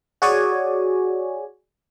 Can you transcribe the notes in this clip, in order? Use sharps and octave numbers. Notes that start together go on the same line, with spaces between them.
F#4 G#4 C#5 D5 G#5